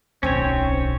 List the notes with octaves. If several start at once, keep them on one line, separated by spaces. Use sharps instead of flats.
D1 B1 C4 C#4 C#5